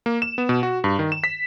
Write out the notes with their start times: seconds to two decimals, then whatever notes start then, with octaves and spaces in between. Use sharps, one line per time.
0.06 A#3
0.22 E7
0.38 B3
0.49 B2
0.63 F#4
0.84 G2
0.99 D#3
1.12 E7
1.24 B6